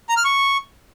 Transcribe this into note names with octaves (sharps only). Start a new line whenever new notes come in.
A#5
F6
C#6